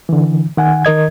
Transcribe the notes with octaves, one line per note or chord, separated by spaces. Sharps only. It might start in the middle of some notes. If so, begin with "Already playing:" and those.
D3 E3
D#3 F#5 G#5
D#3 A#4 D#5 G#6